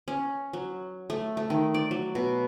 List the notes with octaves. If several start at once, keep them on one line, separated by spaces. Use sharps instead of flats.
C#4
F#3
A3
A3
D#3
D5
F#3
B2